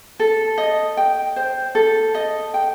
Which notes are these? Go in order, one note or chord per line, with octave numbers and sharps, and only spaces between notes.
A4
D#5
G5
C5
A4
D#5
G5